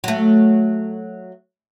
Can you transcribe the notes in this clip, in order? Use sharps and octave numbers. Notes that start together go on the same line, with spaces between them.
F#3 A3